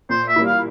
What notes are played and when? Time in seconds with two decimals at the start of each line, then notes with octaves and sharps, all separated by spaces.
0.10 A#2 C5
0.28 E5
0.36 G3 A#3 E4
0.46 F5